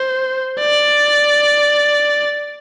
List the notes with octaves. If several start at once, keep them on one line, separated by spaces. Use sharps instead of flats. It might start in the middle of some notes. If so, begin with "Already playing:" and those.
Already playing: C5
D5